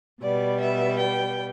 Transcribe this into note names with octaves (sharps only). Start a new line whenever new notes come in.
B2 G3 B3 D5
E5
G5